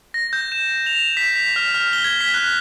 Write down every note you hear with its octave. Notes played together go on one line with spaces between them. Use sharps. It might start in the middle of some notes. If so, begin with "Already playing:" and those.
A#6
G6
E7
F7
B6
B6
F6
F6
G7
G#6
B6
F#6